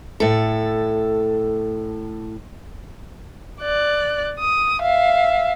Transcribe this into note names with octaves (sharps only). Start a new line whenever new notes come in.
A2 A4
D5 F#6
D#6
E5 F5